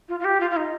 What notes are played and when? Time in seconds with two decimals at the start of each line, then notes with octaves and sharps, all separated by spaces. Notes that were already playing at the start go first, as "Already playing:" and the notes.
0.08 F4
0.19 F4
0.24 G4
0.40 F4
0.50 F4
0.56 D#4